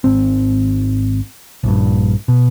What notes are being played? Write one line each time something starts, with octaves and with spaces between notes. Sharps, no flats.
G#1 C4
A#1 G2
B2